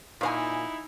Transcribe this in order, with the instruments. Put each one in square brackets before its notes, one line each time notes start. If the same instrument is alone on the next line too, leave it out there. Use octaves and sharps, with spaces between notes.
[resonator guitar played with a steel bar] A#2 C5 G#5 [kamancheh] D#4 E4